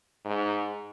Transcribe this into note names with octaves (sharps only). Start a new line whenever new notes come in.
G#2